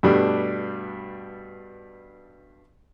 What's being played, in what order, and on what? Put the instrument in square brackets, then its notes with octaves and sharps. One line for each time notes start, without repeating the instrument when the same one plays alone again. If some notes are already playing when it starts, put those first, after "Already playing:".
[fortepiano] G2 B2 G3 A3 D4 D6